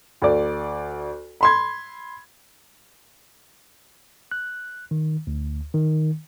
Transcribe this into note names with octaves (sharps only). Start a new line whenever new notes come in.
D2 D5
B5 C6 G#6
F#6
D#3
D2
D#3